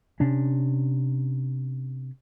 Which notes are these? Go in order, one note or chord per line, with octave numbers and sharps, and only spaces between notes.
C3 C#4 D4